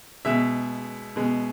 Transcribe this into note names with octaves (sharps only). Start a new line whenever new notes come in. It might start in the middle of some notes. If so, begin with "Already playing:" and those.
B2 G#3 E5
B2 G#3